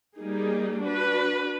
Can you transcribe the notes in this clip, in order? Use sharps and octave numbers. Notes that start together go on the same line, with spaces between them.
G3 A#3 D#4 G#4
D4 F#4 B4